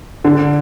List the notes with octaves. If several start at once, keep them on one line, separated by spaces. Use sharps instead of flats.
D3